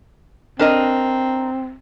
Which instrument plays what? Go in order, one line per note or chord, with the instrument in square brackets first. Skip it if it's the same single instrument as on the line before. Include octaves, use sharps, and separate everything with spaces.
[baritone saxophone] C4 [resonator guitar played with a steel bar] D4 A#4 D#5